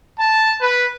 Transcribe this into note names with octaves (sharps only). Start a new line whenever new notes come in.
A5
B4